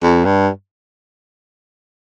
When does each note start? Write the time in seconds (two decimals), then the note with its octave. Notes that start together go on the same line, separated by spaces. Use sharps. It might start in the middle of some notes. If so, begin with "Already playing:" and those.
0.02 F2
0.25 G2